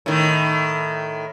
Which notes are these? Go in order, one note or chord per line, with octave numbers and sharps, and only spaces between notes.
A2 D#3